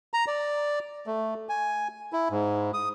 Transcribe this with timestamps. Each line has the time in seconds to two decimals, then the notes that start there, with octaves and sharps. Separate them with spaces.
0.14 A#5
0.27 D5
1.07 A3
1.49 G#5
2.13 E4
2.30 G#2
2.74 D#6